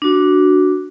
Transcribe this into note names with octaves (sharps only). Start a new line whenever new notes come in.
D4 F#4